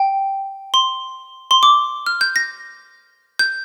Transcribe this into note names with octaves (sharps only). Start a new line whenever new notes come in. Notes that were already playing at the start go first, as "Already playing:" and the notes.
Already playing: G5
C6
C6
D6
F6
G6
A#6
G6